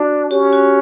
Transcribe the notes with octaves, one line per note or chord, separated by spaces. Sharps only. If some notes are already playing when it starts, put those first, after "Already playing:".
Already playing: D4 F#4
C#4 G4
F#4